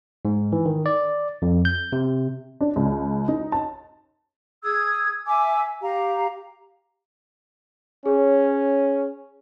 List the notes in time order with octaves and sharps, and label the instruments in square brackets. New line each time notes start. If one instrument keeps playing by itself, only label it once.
[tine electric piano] G#2
E3
D#3
D5
F2
G6
C3
[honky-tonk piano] D4
C#2
D#4
A5
[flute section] G#4 D#6 E6 G#6
E5 G#5 D6 E6
G4 F5 A#5
[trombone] C#4 [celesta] G#4 C#5